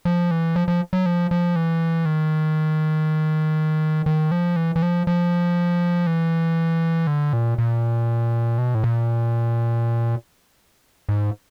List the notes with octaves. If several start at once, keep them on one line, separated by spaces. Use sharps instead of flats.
F3
E3
F3
F3
F#3
F3
F3
E3
D#3
D#3
F3
E3
E3
F3
F3
E3
D3
A#2
A#2
B2
A2
A#2
G#2